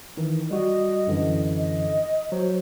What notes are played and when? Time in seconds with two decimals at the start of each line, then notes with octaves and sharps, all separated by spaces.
0.17 D#3 E3
0.51 G3 F#4 D#5
1.07 F#2 D3 E3
1.58 D#5
2.32 F#3 C5